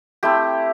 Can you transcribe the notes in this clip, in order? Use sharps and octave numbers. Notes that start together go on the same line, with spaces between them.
A3 C4 E4 G4